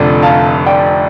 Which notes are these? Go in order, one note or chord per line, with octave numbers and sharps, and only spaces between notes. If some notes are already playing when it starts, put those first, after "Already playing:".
Already playing: F1 F2 D3 D5
F5 A5
D5 G5